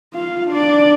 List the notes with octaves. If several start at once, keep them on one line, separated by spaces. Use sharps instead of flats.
F4 F5
D4 D5